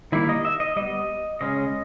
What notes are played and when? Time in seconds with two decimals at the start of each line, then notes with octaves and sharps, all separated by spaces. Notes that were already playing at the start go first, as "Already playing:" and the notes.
0.12 D#3 G3 A#3 E4
0.29 D#5
0.45 E5
0.60 D#5
0.76 G3 B3 D#5
1.41 C#3 G#3 C#4 D#5